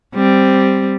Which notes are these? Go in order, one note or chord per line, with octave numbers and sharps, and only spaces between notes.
G3 C4